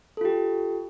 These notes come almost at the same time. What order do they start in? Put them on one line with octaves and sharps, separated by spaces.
A4 F4 G4